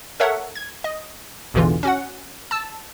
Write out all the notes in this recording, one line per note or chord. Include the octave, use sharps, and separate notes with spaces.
A4 A#4 C#5 E5 F#5
G#6
D#5
A1 E2 B2 D3 E3 F4
C#4 F#4 F#5
A5 E6